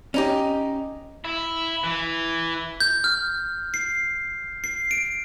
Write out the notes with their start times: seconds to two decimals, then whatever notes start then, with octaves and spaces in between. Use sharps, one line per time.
0.14 C#4 D#4 G4
1.25 E4
1.84 E3
2.80 G6
3.04 F6
3.74 C7
4.64 C7
4.91 D7